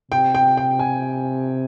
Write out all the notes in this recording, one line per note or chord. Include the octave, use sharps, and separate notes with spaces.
C3 G5
G5
G5
G#5